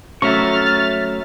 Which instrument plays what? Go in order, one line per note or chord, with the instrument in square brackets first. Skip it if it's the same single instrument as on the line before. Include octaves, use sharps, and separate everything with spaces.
[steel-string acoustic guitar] F#3 A3 C#4 [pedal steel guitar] E5 A#5 C#6 [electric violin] F6 A6